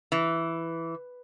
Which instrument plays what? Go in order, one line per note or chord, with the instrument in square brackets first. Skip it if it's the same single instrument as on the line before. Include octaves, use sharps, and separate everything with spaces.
[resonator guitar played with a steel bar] E3